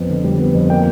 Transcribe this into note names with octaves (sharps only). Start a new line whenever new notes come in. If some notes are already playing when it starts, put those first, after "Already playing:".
Already playing: F2 B3
D3
G3
B3
F2
A#3 G5